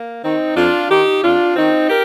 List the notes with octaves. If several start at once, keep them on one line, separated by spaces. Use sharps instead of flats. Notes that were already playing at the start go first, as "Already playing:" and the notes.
Already playing: A#3
D#3 C4 D#4
F2 D4 F4
D#3 D#4 G4
F2 D4 F4
D#3 C4 D#4
G4 A#4